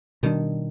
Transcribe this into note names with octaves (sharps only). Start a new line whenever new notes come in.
B2 D#3 G3 A#3 D4